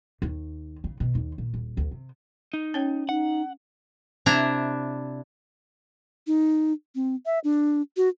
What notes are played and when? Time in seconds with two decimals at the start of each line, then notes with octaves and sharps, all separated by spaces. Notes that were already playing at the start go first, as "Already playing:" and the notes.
0.22 D#2
0.84 C#3
1.00 B2
1.15 D#2
1.38 A#2
1.54 D#1
1.77 D2
1.91 C3
2.53 D#4
2.74 C#4 C#5 G5
3.09 D#4 F#5
4.26 C3 D4 E4 A#5
6.27 D#4
6.95 C4
7.26 E5
7.44 D4
7.97 F#4